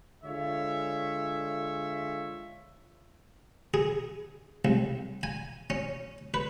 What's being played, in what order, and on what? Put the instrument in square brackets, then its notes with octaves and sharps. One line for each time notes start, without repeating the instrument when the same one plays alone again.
[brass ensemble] D3 G#3 F4 C#5 E5
[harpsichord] G#4
C2
G#5
C#4
B4